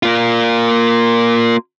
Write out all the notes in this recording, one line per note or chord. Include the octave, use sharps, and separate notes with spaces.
A#3 F4